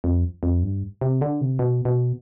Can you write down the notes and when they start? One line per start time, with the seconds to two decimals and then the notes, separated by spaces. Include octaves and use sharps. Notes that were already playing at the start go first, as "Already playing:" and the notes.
0.04 F2
0.43 F2
0.63 G2
1.01 C3
1.21 D3
1.41 C3
1.59 B2
1.85 B2